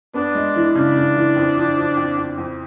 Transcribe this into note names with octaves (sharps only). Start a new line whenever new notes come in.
B3 D4
G#3
E3
C#3 D4
C#3
E3
F2
F3
F3
F2
F2
F2